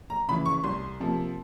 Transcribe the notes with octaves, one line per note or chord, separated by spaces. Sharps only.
A#5
C#3 E3 B5
C#6
C2 C6
C3 F3 A#3